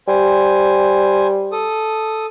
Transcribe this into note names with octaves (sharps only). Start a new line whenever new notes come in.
G3 C5 G#5
A4 D#6